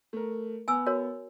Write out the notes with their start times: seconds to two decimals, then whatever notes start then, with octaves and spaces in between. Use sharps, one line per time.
0.13 A3 A#4
0.68 B3 G#5 E6
0.86 F#4 A#4 C#5